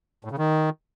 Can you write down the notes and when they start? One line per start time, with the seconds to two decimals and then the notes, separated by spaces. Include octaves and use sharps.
0.25 A2
0.32 C#3
0.38 D#3